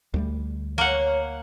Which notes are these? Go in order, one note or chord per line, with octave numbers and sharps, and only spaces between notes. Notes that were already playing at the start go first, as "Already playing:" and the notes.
D2 G3 A3
A#3 C#5 F#5